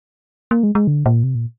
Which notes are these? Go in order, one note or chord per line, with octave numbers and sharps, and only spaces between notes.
A#3
G#3
G#3
D3
A#2
C3
A#2